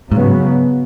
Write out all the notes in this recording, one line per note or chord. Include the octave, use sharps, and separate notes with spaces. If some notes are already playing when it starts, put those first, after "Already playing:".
G#2 C#3 F#3 B3